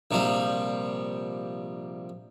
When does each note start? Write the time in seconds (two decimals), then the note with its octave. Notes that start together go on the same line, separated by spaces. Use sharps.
0.11 A#1 C3 F3 G3